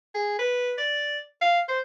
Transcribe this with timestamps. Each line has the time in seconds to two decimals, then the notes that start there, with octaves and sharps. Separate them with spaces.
0.14 G#4
0.39 B4
0.78 D5
1.41 F5
1.68 C5